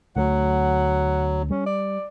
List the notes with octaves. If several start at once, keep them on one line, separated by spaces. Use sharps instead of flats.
D2 F#3 A3 F#5
G3 C#4
D5